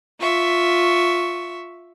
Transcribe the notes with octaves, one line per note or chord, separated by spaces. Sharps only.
F4 E5 C#6